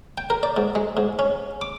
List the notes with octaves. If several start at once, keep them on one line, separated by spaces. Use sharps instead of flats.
G5
A#4
D5
G#2
G#3
G#2
C#4
D6